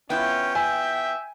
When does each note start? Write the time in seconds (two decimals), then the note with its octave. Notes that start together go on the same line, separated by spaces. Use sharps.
0.10 B3 C#4 E4 F4 G5
0.55 E5 G#5